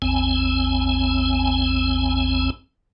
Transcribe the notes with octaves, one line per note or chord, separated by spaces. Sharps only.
A1 E2 C4 G#5